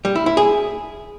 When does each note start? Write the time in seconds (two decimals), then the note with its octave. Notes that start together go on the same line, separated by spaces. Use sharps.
0.05 G3
0.15 E4
0.26 E4
0.37 G#4